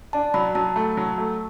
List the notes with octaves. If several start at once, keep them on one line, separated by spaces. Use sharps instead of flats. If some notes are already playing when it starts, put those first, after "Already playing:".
D4 A5
F#3 B5
F#3 A5
A3
F#3
A3